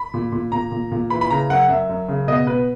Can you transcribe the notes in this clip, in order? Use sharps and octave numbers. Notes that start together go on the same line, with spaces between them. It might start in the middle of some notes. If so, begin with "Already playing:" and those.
Already playing: B5
A#2
A#2
A#2 A#5
A#2
A#2
E3 B5
B5
C#3 A#5
F#2 F#5
F#2 E5
F#2
C#3
B2 D#5
B2 B4